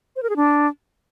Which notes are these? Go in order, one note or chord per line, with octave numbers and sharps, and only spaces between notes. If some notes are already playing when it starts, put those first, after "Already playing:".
C5
A#4
G#4
D4